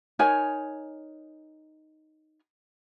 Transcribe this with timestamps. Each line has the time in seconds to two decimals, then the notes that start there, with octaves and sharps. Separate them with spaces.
0.19 D#4 A#4 C#5 G#5